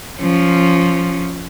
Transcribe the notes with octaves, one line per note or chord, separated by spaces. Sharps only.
F3 C#4